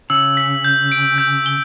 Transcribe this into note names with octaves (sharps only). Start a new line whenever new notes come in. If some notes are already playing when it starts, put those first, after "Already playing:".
C#3 E6
B6
G6
D7
G6
G7